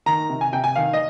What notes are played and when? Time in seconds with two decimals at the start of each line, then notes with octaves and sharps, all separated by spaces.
0.06 D#3 A#5
0.29 C3
0.41 G#5
0.52 C3 G5
0.64 G#5
0.76 D#3 F5
0.93 D#5